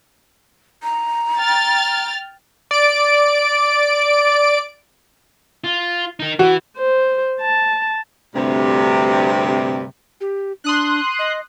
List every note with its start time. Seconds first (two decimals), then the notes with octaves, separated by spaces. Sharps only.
0.83 A#5
1.39 G5 F6 A6
2.71 D5 D7
5.64 F4
6.20 D#4 A#4
6.39 E3 F#4
6.77 C5
7.41 A5
8.35 D2 G2 C3
10.21 G4
10.64 D4 C6 D#6 F#6
11.19 D#5